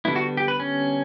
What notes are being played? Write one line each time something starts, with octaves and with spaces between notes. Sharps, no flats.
D3 G3 B3 E4
F#4
G4
B4
C#4